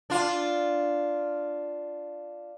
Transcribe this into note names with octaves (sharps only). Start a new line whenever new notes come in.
D4 F4